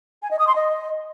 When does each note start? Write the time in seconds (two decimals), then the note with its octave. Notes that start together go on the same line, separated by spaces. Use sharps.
0.22 G#5
0.30 D#5
0.39 D#6
0.47 C6
0.55 D#5